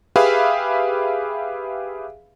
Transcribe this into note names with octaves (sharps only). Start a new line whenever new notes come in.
G4 G#4 B4 E5 F5 B5